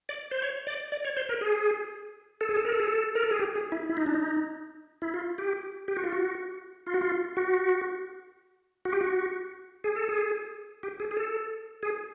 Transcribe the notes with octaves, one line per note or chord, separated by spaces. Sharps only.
D5
C5
C#5
D5
D5
C#5
C5
A#4
G#4
A4
G#4
A4
A#4
A4
G#4
A4
A#4
A4
G#4
G4
G#4
E4
E4
D#4
D4
D#4
E4
F4
G4
G4
F#4
F4
F#4
F4
F#4
F4
F#4
F#4
G4
F#4
G#4
A4
G#4
G4
G#4
G#4
A4
G#4